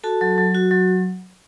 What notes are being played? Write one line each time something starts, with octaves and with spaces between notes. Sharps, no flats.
F#4 A4 A5
F#3
F#3
F#4
F#3